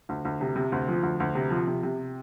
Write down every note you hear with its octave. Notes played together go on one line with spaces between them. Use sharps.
D2
D2
C3
C3
D2
F3
D2
D2
C3
F3
C3
C3